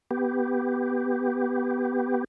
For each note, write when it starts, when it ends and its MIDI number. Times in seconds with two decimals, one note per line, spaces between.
0.11 2.24 59
0.11 2.24 67